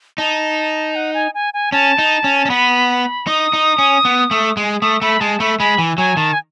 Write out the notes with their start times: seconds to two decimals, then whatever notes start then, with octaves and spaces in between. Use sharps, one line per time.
0.18 D#4 A5
0.95 F#5
1.14 G#5
1.34 G#5
1.54 G#5
1.72 C#4 A5
1.98 D#4
2.24 C#4
2.46 C#4
2.49 B3 B5
3.27 D#4 D#6
3.53 D#4
3.78 C#4
4.05 B3
4.31 A3
4.57 G#3
4.82 A3 D#6
5.02 A3 B5
5.20 G#3 A5
5.40 A3 B5
5.59 G#3 B5
5.78 E3
5.98 F#3 G#5
6.17 D#3 A5
6.33 G#5